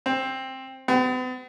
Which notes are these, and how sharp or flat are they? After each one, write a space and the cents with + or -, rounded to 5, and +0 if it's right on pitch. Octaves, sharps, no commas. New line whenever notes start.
C4 +10
B3 +45